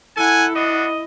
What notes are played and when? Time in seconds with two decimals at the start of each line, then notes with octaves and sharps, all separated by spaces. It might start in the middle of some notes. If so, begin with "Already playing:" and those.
0.17 E4 A4 F#5 G#5
0.56 B3 D4 F#4 D#5